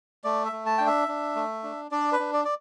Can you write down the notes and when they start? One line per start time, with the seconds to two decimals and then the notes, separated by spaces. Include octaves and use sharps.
0.24 A3 D5
0.45 E5
0.52 A3
0.66 A5
0.78 D4 G5
0.87 E5
1.08 D4
1.36 A3
1.63 D4
1.91 D4 D5
2.12 B4
2.19 D4
2.33 D5
2.45 D5